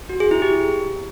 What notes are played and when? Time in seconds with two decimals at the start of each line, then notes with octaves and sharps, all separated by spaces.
0.09 F#4
0.20 G#4
0.31 E4
0.42 G4